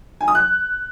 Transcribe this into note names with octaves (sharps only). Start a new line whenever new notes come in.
G#5
D#6
F#6